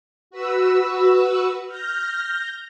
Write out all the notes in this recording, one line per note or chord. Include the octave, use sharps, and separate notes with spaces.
F#4 B4 E6
F6 G6 A#6